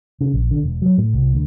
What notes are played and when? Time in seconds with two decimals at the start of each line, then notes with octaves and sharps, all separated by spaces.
0.21 C#3
0.34 A#1
0.51 D3
0.63 E1
0.82 F#3
0.98 A2
1.13 C2
1.34 D2